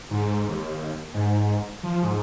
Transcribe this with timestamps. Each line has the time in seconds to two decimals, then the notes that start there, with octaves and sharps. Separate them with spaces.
0.11 G#2
0.48 D#2
1.14 G#2
1.83 F3
2.03 G#2